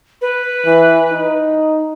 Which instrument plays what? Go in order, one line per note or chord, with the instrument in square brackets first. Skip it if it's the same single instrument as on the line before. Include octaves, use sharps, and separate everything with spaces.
[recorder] B4
[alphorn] E3
D#4